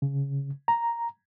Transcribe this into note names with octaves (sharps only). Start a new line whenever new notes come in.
C#3
A#5